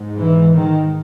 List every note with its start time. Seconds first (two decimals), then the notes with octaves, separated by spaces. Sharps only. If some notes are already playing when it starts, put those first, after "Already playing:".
Already playing: G#2
0.19 E3
0.53 D#3